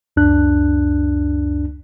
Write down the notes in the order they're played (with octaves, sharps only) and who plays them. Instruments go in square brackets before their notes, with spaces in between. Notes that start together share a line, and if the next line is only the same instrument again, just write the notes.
[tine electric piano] C#2 F#2 D4 F#6